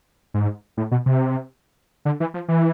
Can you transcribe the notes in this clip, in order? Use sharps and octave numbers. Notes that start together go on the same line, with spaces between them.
G#2
A2
B2
C3
D3
E3
F3
E3